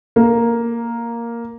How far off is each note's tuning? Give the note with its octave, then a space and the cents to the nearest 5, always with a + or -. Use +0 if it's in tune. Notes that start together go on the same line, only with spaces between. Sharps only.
A#3 +0